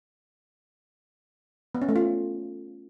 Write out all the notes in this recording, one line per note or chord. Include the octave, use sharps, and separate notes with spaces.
B3
C#4
A3
F4